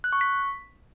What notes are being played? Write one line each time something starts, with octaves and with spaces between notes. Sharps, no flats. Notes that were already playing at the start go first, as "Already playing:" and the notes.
F#6
C#6
B6